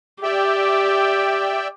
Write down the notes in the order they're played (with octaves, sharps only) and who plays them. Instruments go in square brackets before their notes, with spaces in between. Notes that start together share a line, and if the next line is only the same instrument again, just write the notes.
[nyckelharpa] G4 [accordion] D5 E5 G5